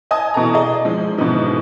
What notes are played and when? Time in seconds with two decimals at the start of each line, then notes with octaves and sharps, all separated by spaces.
0.11 D#5 G#5 A5 D#6
0.34 B2 E3 A4 A5 A#5
0.54 G#4 D5 D#5
0.85 F3 G#3
1.18 G#2 B2 D3 E3 F3 D#4